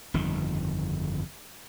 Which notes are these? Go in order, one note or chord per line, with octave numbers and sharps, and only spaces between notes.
G1 F2 D#3